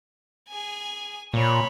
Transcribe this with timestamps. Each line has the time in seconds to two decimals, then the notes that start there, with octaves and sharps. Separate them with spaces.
0.49 G#4 G#5
1.33 A#2 C#5 B5